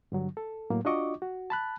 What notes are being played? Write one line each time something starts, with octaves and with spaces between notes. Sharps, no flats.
G2 D3 F#3
A4
A2 F#3 A#3
D4 F4 F#4 D#5 C#6 D6
F#4
A5 B5 F#6